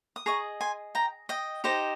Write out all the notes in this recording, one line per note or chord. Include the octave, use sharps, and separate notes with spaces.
D#6
G#4 D#5 A#5 C#6
G#5 C6
G5 A#5
D#5 G5
D#4 G4 C5 D#5